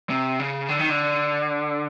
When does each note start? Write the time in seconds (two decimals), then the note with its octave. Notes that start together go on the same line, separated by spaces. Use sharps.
0.10 C3
0.39 C#3
0.68 D3
0.79 D#3
0.90 D3